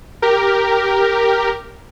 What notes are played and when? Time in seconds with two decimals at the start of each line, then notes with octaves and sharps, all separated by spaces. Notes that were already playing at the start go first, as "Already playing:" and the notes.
0.22 G4 A#4